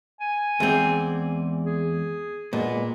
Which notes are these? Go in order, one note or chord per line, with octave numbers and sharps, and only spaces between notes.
G#5
E2 G#3 C4 D5
G#4
A#2 G#3 B3